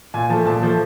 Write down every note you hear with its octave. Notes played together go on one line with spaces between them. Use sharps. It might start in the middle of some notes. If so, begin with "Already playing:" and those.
A#2 G#5
F3 A3 A5
A#2 A5
F3 A3